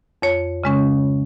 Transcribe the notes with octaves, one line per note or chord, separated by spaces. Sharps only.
F2 C#5
C#3 G#3 C#4